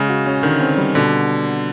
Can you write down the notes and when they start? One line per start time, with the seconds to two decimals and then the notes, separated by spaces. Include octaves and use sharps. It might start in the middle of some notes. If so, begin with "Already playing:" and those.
Already playing: C#3 G#3
0.08 F#4
0.26 C#4
0.43 D3 D#3
0.60 C4
0.77 G3
0.95 B2 D3